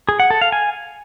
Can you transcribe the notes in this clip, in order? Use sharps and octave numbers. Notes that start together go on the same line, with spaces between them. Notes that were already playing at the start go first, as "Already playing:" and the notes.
G#4
F#5
A4
F5
G#5